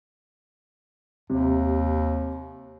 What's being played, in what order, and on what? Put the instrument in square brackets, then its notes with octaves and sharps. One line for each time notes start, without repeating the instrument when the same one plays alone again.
[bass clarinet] D#2 [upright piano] C3